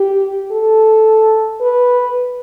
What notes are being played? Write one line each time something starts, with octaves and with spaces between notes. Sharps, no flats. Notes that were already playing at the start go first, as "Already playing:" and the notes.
Already playing: G4
A4
B4